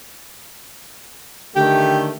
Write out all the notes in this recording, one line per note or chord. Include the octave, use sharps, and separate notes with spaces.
D3 D#3 A3 G4